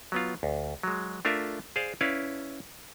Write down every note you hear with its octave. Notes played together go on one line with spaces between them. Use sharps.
F#3 B3 F4
D2
F#3 G#3
A3 D4 F4 A#4 E5
G#4 C5 D5 F5
C#4 E4 B4 D5 F5